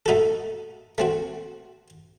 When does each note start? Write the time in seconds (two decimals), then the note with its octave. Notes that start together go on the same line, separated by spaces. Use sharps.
0.06 A3 D#4 F#4 A4
0.98 A3 C4 F#4